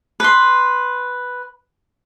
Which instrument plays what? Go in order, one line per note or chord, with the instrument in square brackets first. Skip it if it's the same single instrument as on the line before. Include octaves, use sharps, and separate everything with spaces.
[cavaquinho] B4 C6